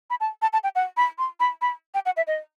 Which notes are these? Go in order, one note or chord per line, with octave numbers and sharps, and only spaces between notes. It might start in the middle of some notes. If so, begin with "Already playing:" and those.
B5
A5
A5
A5
G5
F#5
B5
C6
B5
B5
G5
F#5
E5
D#5